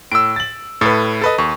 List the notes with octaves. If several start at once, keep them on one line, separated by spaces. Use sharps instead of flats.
A2 E6 D7
A6 F#7
A2 A4 B4
A4 B4 D#5
D#2 C#6